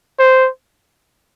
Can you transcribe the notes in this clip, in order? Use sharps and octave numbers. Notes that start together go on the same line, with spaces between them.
C5